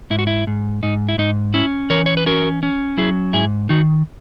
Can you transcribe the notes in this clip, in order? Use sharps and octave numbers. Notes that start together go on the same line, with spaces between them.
G#2 E4
F#4
E4
G#2
G#2 D#4
E4
G#2 D#4
C#4 E4
E3 A#4 C#5
C#5
B4
C#4 F#4 A#4
C#4
F#3 E4 G#4
G#2 E4 G#4
D#3 D#4 F#4